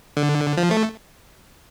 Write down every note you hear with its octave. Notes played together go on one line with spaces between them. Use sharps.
D3
F3
A3